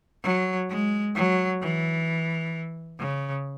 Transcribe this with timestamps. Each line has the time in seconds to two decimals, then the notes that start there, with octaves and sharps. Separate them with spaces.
0.23 F#3
0.70 G#3
1.15 F#3
1.61 E3
2.99 C#3